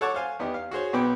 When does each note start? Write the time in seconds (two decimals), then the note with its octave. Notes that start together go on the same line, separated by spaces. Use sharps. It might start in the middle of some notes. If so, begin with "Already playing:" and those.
0.01 A4 C#5 F#5 A5 C#6 D6
0.14 C5 F5 G#5
0.39 E2 B3 D#4 G4
0.54 F5
0.71 F#4 G#4 C5 C#5
0.93 B1 B2 B3 B4 G5 D6